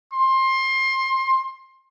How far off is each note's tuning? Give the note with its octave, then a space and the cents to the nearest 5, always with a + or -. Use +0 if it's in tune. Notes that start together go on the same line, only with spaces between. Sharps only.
C6 +25